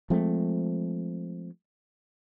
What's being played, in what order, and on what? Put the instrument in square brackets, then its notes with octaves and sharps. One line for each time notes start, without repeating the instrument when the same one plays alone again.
[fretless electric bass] F3 G#3 A3 C4